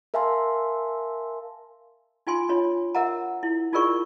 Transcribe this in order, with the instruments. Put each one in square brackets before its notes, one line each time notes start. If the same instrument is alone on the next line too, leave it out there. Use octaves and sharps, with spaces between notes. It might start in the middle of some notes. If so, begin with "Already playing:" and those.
[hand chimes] A#4 E5 F5 G#5 A5 C6
[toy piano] D#4 F4 G#5 C6
D4 F4 C#5
A#4 E5 F#5 A#5
E4
D#4 F4 G#4 A#4 D5 C#6